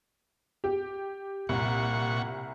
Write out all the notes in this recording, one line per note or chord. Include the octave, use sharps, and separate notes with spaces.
G4
C2 A#2 F#5 C#6